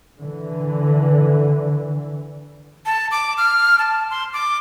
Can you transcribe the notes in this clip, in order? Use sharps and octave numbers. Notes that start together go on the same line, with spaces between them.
D3 E3
A5
D6
F6
A5
C6
D6